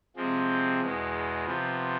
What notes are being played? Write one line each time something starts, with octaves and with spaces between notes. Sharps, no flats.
C3 F3 G#3 C4
E2 B2 G#3
C3 F3 B3